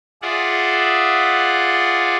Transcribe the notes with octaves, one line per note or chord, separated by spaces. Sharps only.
F4 G#4 D5 E5 F#5